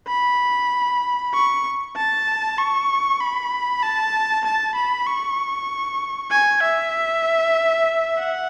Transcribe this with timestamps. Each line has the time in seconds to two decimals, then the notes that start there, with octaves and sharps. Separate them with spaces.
0.08 B5
1.34 C#6
1.96 A5
2.58 C#6
3.21 B5
3.83 A5
4.45 A5
4.75 B5
5.06 C#6
6.31 G#5
6.63 E5
8.19 F#5